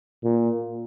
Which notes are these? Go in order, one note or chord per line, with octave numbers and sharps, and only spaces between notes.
A#2